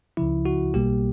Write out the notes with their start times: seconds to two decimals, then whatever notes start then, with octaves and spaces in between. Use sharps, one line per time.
0.17 C#2 C#3 F3 E4
0.45 F#4
0.74 B1 B2 G3 A#3 G4